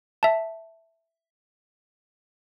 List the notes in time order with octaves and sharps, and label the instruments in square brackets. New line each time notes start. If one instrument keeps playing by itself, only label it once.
[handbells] E5 A5